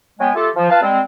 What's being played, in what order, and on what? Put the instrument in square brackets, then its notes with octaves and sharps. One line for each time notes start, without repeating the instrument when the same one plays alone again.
[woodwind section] F#3 G#3 B3 G5 G#5
A3 F4 G4 A4
F3
F4 B4 F5 A5
G3 G#3 C4